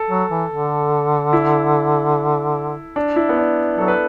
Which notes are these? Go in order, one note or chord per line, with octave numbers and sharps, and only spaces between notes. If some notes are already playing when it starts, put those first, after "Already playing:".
Already playing: A4
F#3
E3
D3
E4
D4
E4
B3
D4
F#3 A4
B4